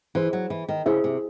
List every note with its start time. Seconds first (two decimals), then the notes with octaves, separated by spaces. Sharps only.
0.15 E3 E4 G#4 C5 E5
0.33 F#3
0.50 E3
0.69 D#3
0.86 C#3 E4 G#4 C5 E5
1.04 C3